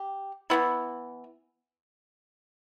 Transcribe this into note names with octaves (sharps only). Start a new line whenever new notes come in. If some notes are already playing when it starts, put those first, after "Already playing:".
Already playing: G4
E3 B3 E4